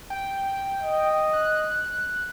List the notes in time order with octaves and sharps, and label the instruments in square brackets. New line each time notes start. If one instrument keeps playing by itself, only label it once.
[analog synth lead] G5
[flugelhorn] D#5
[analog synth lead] F#6